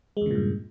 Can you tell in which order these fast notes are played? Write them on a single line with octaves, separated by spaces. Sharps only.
G#3 E2 C#3 A#2 G2